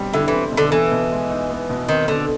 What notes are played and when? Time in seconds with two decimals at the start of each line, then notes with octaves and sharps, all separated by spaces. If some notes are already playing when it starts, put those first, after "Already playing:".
Already playing: B2 G3 C4
0.14 D3 E4
0.28 E3 C4
0.52 B2
0.57 D3
0.72 E3 B3
0.91 B2
1.12 G#3
1.30 D#4
1.50 B3
1.69 B2
1.89 D#3 C4
2.08 B2 D3